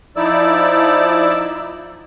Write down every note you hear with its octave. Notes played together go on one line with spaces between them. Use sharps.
F3 D#4 E4 D5 E6